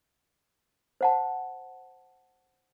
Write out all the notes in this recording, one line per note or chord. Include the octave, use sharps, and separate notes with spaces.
C5 F#5 A5